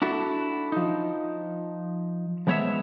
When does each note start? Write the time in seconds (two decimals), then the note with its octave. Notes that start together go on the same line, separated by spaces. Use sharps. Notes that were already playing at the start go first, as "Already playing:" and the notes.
0.02 D4 E4 F#4 A4
0.72 F3 D#4
2.47 F3 G#3 B3 C#5 D5 E5